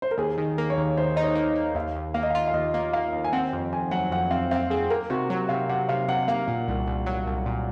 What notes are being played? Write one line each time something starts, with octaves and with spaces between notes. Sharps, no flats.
C5
A#4
D#2 G#4
D#3
A#3
C#5
D#2
D#3 C5
D#4 D#5
C#5
A#3
D#5
A#3
D#2 F5
D#2
A#3 F5
D#5
F5
F4
F5
D#2 D#5
A#3
A#3 F5
D#2
G#5
C4 F#5
F2
F2 G#5
F#3 F#5
F2 F#5
C4 F5
C4 F5
C4 G#4
A#3 A#4
C3 F#4
F#3
C3 F5
C3 F#5
C3 F5
C3 F#5
A#3 F5
A#2
C2
C2
F#3
C2
A#2